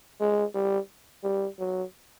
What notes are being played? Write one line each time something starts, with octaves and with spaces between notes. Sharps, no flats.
G#3
G3
G3
F#3